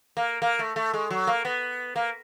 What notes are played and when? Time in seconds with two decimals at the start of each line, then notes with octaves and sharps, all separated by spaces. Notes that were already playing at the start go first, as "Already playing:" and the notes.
0.17 A#3
0.42 A#3
0.59 A3
0.76 A3
0.93 G#3
1.11 F#3
1.27 A#3
1.45 B3
1.96 A#3